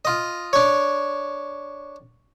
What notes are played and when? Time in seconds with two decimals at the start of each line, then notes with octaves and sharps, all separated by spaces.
0.05 F4 D#5
0.53 D4 C#5